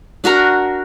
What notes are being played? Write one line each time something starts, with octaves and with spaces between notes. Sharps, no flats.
D4 F#4 A#4 A#5